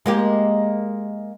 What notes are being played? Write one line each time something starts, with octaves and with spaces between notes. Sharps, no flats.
G#3 A#3 G4